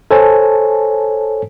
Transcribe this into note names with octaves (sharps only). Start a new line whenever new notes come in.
A4 C5 C#5 G#5 A5